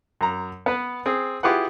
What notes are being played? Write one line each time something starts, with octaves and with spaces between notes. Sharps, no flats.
F#2 A#5
B3 B4
C4 G#4
E4 F4 G4 G#4 B4 F#5